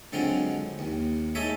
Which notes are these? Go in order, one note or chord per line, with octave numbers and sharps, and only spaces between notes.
D3 F#3 G#3 C4 F4
D#2
G#3 D#4 A4 C#5 D#5 E5